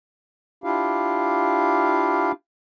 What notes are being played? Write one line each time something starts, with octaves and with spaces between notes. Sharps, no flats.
D4 E4 F4 G4 F5